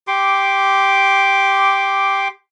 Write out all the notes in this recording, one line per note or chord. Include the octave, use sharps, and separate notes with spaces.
G4 C6 D6